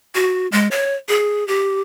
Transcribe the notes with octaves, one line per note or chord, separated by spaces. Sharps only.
F#4
G#3
C#5
G#4
G4